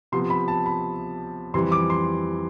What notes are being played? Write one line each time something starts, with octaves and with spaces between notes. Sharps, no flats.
C3 F3 B3 C6
B5
A5
B5
F2 E3 G3 C6
D6
C6